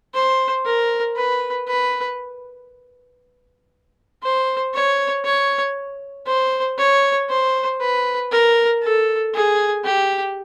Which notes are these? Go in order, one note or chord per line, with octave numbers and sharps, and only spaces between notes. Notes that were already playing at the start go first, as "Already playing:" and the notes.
C5
A#4
B4
B4
C5
C#5
C#5
C5
C#5
C5
B4
A#4
A4
G#4
G4